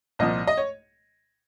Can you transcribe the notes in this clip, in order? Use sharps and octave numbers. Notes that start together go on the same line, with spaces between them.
C2 A#2 F3 D#5
D#5
C#5